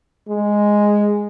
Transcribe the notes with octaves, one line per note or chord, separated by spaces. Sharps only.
G#3